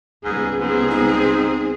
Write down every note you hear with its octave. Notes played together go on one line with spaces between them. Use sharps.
C#2 G#2 G3 B3 G#4
G#2 C4 G#4
D#4